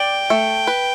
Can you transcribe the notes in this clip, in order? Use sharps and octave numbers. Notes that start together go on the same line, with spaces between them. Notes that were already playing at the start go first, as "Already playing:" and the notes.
Already playing: D5 G5
A3
B4